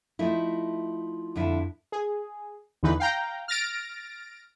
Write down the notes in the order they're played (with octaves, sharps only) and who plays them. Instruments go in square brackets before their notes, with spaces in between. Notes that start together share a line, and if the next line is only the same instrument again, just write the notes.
[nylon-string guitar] F3 A3 D#4 E4
F2 D3 E4
[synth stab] G#4
E2 D3 E3 D#4 B4
F5 G5 A#5
F6 A6 A#6 D7